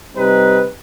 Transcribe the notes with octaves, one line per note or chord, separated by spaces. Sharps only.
C3 G3 C4 D#4 B4